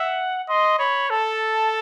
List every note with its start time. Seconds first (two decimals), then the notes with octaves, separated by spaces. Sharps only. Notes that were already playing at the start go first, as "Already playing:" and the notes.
Already playing: E5 F#5
0.49 D#5 C6
0.79 C#5 B5
1.10 A4 A5